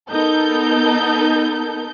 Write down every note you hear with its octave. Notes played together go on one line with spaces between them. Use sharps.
B3 D#4 A4 A#4 G6